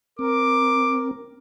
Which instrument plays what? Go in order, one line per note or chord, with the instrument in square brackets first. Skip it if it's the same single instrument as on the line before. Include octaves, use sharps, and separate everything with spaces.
[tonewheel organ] C4 [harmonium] A#4 [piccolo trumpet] D6